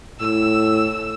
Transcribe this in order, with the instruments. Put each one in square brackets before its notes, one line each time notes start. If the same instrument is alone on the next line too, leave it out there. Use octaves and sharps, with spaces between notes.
[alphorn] A2 [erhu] E6